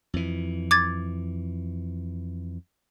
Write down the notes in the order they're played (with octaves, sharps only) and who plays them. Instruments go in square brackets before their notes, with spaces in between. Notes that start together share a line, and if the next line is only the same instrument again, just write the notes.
[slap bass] F2 E3
[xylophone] D6 G#6 A6